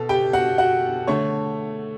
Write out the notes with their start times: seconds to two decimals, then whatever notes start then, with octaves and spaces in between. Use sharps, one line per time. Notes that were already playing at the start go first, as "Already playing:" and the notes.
Already playing: B2 A4
0.09 G4 G5
0.33 F#4 F#5
0.58 F#4 F#5
1.07 D3 A3 C#5 C#6